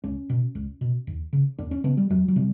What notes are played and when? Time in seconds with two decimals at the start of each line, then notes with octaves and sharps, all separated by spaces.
0.04 C#2 C#4
0.30 B2
0.55 C#2
0.81 B2
1.07 D#2
1.33 C#3
1.59 D#2 D4
1.71 C#4
1.84 C#3 B3
1.97 G3
2.10 E2 F#3
2.28 F#3
2.36 C3 G3